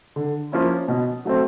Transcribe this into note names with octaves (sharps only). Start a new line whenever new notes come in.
D3
F3 A#3 C#4 E4
B2
F#3 A3 C4